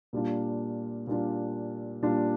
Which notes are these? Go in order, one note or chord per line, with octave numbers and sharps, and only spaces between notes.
A#2 G3 D4 F4
A#2 G3 D4 F4
A#2 G3 D4 F4